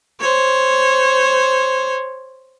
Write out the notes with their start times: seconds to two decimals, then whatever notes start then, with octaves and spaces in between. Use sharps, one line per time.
0.21 C5 C#5